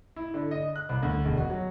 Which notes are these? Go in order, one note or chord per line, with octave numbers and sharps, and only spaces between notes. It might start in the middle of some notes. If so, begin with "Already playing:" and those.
E4
D3
D#5
F#6
C2
D2
E1
F#4
F#3